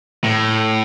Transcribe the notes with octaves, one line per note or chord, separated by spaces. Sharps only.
A2